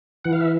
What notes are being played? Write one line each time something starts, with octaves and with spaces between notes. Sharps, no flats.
E3 F#5
F5
E5